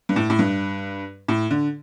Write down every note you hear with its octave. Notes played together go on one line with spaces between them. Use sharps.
G2
A2
A2
G2
A2
D3